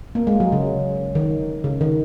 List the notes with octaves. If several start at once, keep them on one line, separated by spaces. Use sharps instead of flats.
A#3
G#3
F#3
C#3
D#3
C#3
D#3